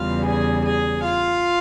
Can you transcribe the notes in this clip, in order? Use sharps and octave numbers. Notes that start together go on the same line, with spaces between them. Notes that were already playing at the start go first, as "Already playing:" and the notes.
Already playing: E2 C#3 G3 F4 F5
G#4 G#5
G#4 G#5
F4 F5